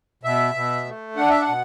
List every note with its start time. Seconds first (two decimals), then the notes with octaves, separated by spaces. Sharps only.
0.23 B2 E5
0.55 B2
0.86 A3
1.16 D4 F#5
1.29 E5
1.42 F#5
1.48 B2